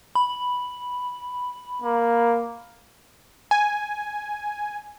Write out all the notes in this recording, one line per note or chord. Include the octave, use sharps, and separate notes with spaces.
B5
A#3
G#5